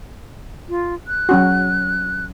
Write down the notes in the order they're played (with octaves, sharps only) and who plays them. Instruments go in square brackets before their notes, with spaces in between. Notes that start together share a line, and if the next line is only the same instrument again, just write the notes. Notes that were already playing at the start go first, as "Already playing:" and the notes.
[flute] F4
F#6
[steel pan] F#3 C#4 F#4